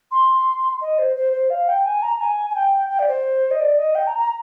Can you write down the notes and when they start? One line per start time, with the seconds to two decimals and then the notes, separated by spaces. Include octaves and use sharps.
0.11 C6
0.81 D#5
0.98 C5
1.15 C5
1.33 C5
1.49 F5
1.68 G5
1.85 G#5
2.02 A#5
2.20 G#5
2.49 G#5
2.54 G5
2.89 G5
2.98 D5
3.08 C5
3.50 D#5
3.59 D5
3.78 D#5
3.94 G5
4.06 A#5
4.18 A#5